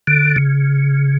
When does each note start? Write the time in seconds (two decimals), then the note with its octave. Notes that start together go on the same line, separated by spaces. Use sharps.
0.07 D3
0.36 C#3